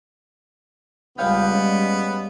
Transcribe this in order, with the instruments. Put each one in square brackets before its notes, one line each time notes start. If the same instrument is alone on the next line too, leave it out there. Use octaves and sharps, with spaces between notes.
[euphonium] C#2 [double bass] G3 G#3 [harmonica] B3 [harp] C#5 F5 G5
[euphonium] C#4